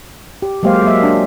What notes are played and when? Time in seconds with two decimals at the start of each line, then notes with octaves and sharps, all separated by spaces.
0.42 G4
0.63 F#3 G#3 A#3 G4 C5 F5
0.83 F#3 A#3 E5
1.03 D4